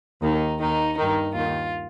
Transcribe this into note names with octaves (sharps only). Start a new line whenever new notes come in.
D#2 D#3 D#4
D#2 D#3 D#4
G2 D#3 D#4
D#2 D#3 F4